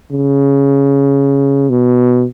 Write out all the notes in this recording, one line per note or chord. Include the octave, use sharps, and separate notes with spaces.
C#3
B2